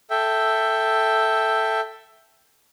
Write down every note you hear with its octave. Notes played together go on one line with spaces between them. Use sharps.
A4 E5 G5